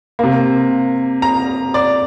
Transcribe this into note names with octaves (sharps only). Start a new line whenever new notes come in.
C3 A#3
A#5
D5